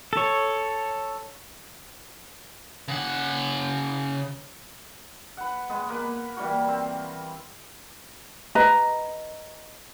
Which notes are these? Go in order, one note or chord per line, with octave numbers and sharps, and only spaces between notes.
A4 C#5
C#3 F#5
B4 F#5
G#3 B3
A#3 B4
E3 G3 A#3 F#4
C4
B4 D#5 A#5